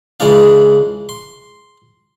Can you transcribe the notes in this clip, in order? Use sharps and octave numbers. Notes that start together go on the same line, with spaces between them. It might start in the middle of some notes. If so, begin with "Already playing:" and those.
C#2 C#3 E3 G#3 D4 F5
C6